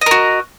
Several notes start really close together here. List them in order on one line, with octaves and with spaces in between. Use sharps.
D#5 A#4 F#4